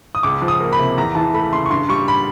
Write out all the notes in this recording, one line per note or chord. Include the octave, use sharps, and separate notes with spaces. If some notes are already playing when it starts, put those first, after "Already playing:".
D#6
C#2 D6
F3
D#6
A#3
B5
C3
E2 A#5
E3 A5
A3 B5
C#3 C6
C#6
G2 C6
G3 C#6
B5